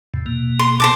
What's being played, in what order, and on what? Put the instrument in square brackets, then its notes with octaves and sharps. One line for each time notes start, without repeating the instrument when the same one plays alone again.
[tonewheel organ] E2 A2 C3
B2 A#3
[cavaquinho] C6
[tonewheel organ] B2 [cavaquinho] C5 A5 D6